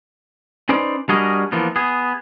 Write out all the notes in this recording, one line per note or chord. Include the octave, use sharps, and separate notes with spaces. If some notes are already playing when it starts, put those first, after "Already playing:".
C#4 D#4 B4 C5 D5
G3 D4 F#4 G#4 A#4 D#5
E3 F3 A#3 B3
B3 G#4